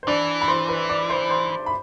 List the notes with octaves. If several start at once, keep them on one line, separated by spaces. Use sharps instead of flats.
C5
E3 D4 D5
B5
C5 C6
B4 B5
D5 D6
C5 C6
C5 C6
B5